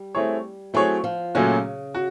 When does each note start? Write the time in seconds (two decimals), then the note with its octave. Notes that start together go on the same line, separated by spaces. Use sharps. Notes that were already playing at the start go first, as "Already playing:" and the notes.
Already playing: G3
0.14 A3 C4 E4 G#4 C#5
0.74 F#3 A3 C4 E4 G#4 C#5
1.04 F3
1.35 A#2 C#3 F#3 A3 C#4 F#4
1.95 F#4